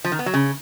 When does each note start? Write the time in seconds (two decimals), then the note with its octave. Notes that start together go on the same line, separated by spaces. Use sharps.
0.05 F3
0.12 D#3
0.19 B3
0.26 F#3
0.34 C#3